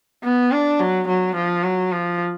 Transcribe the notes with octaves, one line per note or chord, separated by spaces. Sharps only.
B3
D4
F#3
F#3
F3
F#3
F3